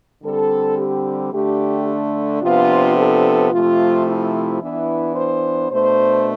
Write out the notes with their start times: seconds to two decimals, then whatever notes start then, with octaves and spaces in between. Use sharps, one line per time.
0.23 D3 G3 C4 A4
0.78 G4
1.33 D3 A3 D4 G4
2.42 C3 F3 B3 D4 F4
2.97 A4
3.52 C3 F3 A3 F4
4.07 E4
4.61 E3 B3 D4 E4
5.16 C5
5.72 B2 A3 D4 C5